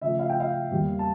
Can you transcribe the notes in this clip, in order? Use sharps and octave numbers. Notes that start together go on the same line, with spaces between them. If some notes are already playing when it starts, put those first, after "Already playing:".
C#3 F3 A3 E5
F5
G5
F5
E2 E3 G3 A#3
A5